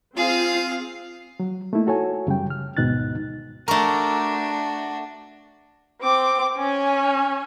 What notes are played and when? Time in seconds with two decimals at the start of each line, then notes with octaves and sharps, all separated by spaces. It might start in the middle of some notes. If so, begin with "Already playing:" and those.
0.16 C4 F4 G#4 F5
1.40 F#3
1.73 A3 A#3 D#4 E4
1.87 F#4 A4 C#5 G#5
2.27 F#2 C#3 G3 G5
2.50 F6
2.77 D2 G#2 B2 D#4 F#6 A6
3.68 A3 D4 F#4 A#4 A#5 C#6
6.02 C4 D6
6.58 C#4 G#5